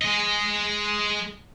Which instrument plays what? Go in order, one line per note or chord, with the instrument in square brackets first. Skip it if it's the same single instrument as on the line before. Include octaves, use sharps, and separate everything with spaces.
[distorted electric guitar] G#3 D#5